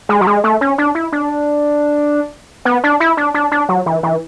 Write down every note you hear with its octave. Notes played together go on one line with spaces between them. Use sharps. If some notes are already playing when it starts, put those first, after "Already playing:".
G#3
F#3
G#3
A3
C#4
D4
E4
D4
B3
D4
E4
D4
D4
D4
F#3
E3
E3